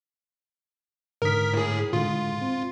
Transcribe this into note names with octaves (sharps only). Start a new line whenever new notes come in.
G#2 D3 A#4 D#6 B6
A2 G#4
A2 D3 G#3 F4
C4